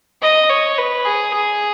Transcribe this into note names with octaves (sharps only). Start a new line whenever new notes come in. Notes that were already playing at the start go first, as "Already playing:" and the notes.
D#5
C#5
B4
G#4
G#4